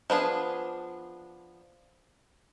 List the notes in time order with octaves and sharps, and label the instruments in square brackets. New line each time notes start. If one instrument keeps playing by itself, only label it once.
[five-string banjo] F3 B3 D4 G#4